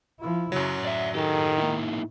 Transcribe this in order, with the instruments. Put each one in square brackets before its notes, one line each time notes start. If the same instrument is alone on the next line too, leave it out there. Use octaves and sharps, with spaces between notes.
[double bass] F3 E4
[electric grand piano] F#2 F#3 [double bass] C#3
[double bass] A2 [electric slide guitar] D5 E5
[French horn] D#3 [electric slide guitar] G4 A4
[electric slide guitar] A#3 D#4 E4